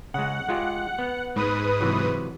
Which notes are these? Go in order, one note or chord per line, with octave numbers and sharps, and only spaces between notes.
C#3 G#3 F#5
G#3 F4 G4
B3
G#2 B4 D#6
C3 E3 F#3